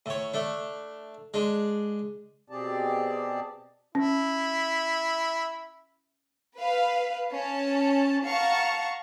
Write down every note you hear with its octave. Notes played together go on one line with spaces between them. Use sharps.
A2 C#5
A3 D4
G#3 D4
B2 C4 G4 G#4 D5 A5
C#4 E4
B4 F5
C#4 A5
F5 F#5 A5 A#5 C#6